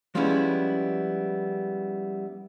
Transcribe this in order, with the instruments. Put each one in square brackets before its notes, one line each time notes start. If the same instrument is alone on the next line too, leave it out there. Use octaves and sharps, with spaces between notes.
[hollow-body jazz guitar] F3 G3 G#3 B3 C#4 E4